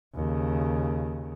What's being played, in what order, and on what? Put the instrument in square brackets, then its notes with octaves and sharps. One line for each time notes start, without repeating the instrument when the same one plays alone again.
[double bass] D#2 C#3